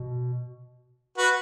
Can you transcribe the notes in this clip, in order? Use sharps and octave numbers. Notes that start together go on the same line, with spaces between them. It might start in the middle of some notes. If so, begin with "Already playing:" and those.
Already playing: B2
F#4 B4